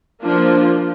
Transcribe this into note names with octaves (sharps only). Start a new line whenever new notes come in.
F3 A#3 D4 F4